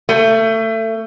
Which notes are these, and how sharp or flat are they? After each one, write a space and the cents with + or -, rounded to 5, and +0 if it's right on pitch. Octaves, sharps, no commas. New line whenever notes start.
A3 +25